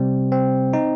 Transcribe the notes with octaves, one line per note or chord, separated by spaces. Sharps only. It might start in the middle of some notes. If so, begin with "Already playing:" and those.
Already playing: C3 G3 C4
C4
D#4